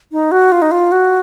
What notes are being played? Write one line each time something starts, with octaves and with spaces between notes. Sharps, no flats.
D#4
F#4
F4
D#4
F4
F#4